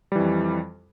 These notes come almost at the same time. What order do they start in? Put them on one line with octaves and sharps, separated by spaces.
G3 E3 F2